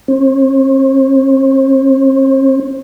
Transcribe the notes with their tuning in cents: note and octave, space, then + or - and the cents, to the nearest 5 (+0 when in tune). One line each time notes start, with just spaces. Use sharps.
C4 +45